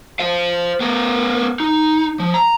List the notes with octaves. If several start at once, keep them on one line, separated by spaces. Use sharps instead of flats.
C5 F5
B3 A#4
D#4
F3
A#5